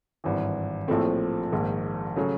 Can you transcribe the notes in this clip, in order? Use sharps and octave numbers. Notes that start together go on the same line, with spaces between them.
G#1 G2 E3
A#1 A2 F3 A3 C4
A#1 G#2 D#3
C#3 F#3 A3